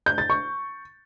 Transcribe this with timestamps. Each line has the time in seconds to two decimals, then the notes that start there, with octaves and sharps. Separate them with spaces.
0.06 G6
0.18 A6
0.30 C#6